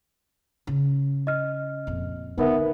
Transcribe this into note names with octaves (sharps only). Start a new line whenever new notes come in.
C#3
D#5 F6
F2 A#2
D3 B3 C#4 D#4 A#4 E5